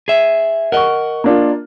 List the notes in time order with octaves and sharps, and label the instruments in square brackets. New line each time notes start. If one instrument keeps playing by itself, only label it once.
[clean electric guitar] G#4 E5
[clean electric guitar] A#4 D#5 [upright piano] F#5 C#6
[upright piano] A#3 D4 F4